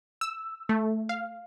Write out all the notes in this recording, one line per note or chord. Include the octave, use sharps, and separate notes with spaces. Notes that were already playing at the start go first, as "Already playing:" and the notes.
E6
A3
F5